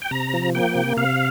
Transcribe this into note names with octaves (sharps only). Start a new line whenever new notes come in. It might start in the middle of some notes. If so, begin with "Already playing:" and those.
G5
C3 A#5
F3
A#3 G5
C3
C3 F5